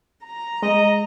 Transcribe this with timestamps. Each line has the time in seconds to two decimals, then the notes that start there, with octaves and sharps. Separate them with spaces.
0.24 A#5
0.62 G#3 D#5